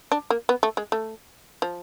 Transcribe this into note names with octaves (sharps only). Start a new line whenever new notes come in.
D4
A#3
B3
A3
G#3
A3
F3